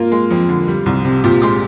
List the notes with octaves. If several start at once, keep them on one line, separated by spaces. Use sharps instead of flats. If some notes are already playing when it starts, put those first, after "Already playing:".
Already playing: A#3 F4
G#3
F2
D3
G3
C2
C3
A#2 G4
G#3 G4